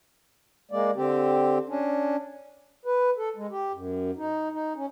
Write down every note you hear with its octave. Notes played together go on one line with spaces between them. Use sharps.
G#3 A#3 D5
D3 C4 G4
C#4 D4
B4
A4
G#3
G4
F#2
D#4
D#4
C#4